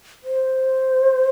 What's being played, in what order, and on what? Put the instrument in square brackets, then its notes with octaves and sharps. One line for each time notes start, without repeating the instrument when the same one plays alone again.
[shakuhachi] C5